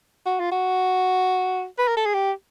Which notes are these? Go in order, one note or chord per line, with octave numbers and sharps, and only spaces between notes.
F#4
F4
F#4
B4
A#4
A4
G#4
G4